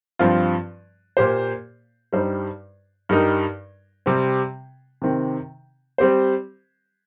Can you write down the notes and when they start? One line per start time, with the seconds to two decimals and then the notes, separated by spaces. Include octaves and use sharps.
0.19 G2 F3 C4 F4
1.17 A#2 A#3 G4 C5
2.13 G2 G3 D#4 C5
3.09 G2 G3 D#4 A#4
4.06 C3 G3 C4
5.02 C3 D#3 C4
5.98 G3 C4 G4 C5